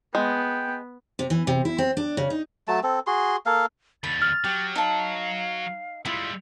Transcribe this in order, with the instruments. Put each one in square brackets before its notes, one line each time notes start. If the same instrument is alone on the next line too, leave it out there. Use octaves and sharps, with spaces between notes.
[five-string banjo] G#3 [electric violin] B3 [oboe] G5
[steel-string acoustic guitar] C3
E3
C3
E4
C4
D4
C#3
D#4
[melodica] F#3 A3 A5
C4 A4
F#4 G#4 C6
A#3 A4 F5
[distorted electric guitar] D#2 D3 [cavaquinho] B5 [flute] A6
[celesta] F6
[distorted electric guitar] F#3 [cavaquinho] G4
[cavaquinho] D#4 A5 [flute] F5
[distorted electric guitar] G3 G#3 [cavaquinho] E4 F4 [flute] E6